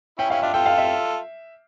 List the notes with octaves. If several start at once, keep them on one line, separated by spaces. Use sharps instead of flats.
C#4 E4 G5
C#4 E4 F5
D4 F4 E5
F4 A4 G5
F5
E5